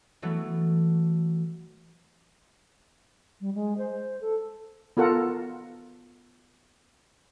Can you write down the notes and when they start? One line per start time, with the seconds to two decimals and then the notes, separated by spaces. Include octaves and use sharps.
0.22 E3 F#3 A3 B3
3.41 G3
3.55 G#3
3.78 C5
4.21 A4
4.97 B3 F4 A4 A#4 F#5